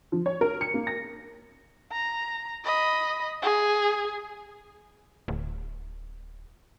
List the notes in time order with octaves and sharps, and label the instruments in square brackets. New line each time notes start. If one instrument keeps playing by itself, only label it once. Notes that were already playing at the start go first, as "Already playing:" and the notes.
[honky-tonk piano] F3
C#5
A#4
C#7
A#3
A#6
[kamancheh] A#5
D#5 B5
G#4
[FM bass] D1